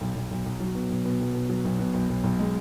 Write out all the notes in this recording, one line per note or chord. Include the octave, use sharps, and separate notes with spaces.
B1
B1
B1
B1
F#3
B2
B1
B2
B1
B2
F#3
B1
B2
B1
B1
B1
G#3